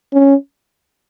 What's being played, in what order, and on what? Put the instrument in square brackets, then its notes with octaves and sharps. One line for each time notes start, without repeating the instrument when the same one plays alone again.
[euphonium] C#4